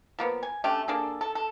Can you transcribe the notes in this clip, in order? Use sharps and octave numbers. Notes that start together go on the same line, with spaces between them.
F3 A#3 B3
G#5
A3 C#4 D4 G4
A#3 D4 G#4 A4
A4
A4